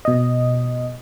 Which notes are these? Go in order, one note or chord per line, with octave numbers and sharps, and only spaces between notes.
B2 D#5